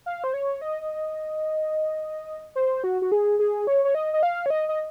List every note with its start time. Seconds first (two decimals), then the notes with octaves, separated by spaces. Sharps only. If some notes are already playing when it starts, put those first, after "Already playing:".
0.06 F5
0.24 C5
0.34 C#5
0.61 D#5
2.56 C5
2.84 F#4
3.02 F#4
3.12 G#4
3.39 G#4
3.67 C#5
3.85 C#5
3.95 D#5
4.14 D#5
4.23 F5
4.46 C#5
4.50 D#5
4.69 D#5